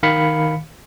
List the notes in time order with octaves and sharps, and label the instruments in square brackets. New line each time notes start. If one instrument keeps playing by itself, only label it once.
[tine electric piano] D#3 F5 B5 B6 C#7